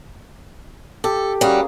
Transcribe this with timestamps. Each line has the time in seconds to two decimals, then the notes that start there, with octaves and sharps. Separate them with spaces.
1.04 G4 A4
1.41 G3 A#3 C#4 F#4 G#4